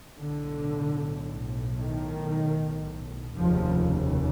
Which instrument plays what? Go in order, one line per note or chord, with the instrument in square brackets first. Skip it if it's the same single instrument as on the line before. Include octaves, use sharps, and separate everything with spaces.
[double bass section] B1 A2 D3
D#3
F1 D#2 C#3 F3